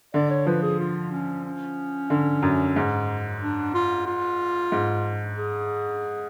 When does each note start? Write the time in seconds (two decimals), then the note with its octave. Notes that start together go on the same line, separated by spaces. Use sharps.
0.14 D3 D5
0.30 C#5
0.46 F3 B4
0.62 G#4
0.80 F4
1.12 C#4
1.45 C#4
2.10 D3
2.42 F#2
2.76 G#2
3.42 D4
3.74 F4
4.07 F4
4.72 G#2
5.38 G#4